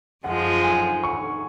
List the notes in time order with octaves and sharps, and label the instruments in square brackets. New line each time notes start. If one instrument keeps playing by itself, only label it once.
[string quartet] F#2 F3 G#3 [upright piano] F#5
[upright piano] G#5
C#6